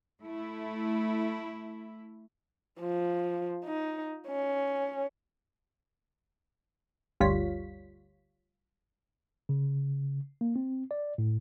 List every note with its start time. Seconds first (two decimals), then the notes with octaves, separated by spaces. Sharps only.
0.21 A3 E4
2.80 F3
3.65 D#4
4.28 C#4
7.20 G1 D2 G3 F4 C#5 B6
9.49 C#3
10.41 A#3
10.56 C4
10.91 D5
11.18 A2